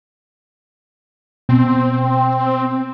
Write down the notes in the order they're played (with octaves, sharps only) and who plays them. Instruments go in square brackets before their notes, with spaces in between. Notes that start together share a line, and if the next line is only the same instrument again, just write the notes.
[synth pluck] B2 [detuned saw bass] C4